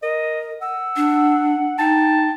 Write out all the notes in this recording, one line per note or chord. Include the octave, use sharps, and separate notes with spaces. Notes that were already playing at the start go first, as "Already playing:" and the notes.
A#4 D#5
F#5 E6
D4
D#4 G5 A5